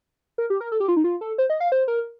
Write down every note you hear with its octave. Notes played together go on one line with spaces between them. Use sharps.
A#4
G4
A#4
A4
G4
F4
D#4
F4
A4
C5
D#5
F5
C5
A#4